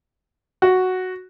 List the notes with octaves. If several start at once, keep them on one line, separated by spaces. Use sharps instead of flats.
F#4